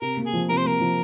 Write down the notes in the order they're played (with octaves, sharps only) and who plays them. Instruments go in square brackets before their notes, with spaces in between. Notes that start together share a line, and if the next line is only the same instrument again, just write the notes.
[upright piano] C3 [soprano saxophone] A#4
[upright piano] A#3
[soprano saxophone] G#4
[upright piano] F3
[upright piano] C3 [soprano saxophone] A#4
[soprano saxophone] C5
[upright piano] A#3 [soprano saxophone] A#4
[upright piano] F3